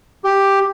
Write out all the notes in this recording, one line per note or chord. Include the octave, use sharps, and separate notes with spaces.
G4